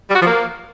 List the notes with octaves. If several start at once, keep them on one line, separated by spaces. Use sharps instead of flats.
G3
F#4
F3
A#3